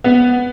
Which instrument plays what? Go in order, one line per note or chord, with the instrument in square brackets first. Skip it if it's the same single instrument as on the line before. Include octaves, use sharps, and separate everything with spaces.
[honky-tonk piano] B3